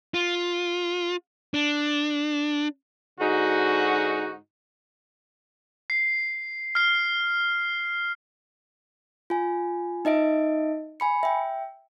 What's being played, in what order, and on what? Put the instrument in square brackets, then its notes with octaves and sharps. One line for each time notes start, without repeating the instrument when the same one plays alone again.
[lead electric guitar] F4
D4
[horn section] G#2 D3 D#4 F#4
[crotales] C7
F6 C7
[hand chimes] F4 G#5
D#4 D#5 E5 D7
G#5 B5 C#7
E5 G5